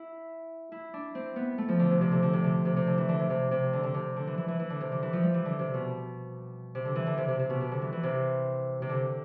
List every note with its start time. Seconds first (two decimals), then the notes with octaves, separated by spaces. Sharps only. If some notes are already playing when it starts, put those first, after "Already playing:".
Already playing: E4
0.72 E4
0.94 D4
1.15 C4
1.36 B3
1.58 A3
1.69 F3
1.79 D3
1.91 C3
2.01 C3
2.12 D3
2.22 D3
2.33 C3
2.44 D3
2.65 C3
2.76 C3
2.87 D3
2.98 E3
3.09 D3
3.19 C3
3.30 C3
3.51 C3
3.73 D3
3.83 D3
3.94 C3
4.16 D3
4.27 E3
4.38 E3
4.48 E3
4.60 E3
4.70 D3
4.81 C3
4.92 D3
5.03 E3
5.13 F3
5.23 G3
5.34 E3
5.45 D3
5.59 C3
5.74 B2
6.75 C3
6.85 D3
6.96 E3
7.07 D3
7.18 C3
7.28 C3
7.39 C3
7.50 B2
7.61 C3
7.71 D3
7.82 E3
7.92 E3
8.03 C3
8.82 C3
8.89 D3